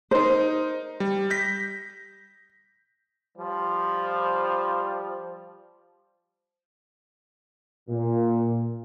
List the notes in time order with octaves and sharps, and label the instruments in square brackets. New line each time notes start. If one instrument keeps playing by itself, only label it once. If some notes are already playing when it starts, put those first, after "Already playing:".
[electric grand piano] D#4 A#4 [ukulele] C5
[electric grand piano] G3
G6 A#6 B6
[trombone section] F3 G3
[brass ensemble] A#2